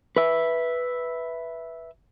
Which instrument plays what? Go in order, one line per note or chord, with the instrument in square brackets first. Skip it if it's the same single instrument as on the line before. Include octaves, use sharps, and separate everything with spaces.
[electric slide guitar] B4 E5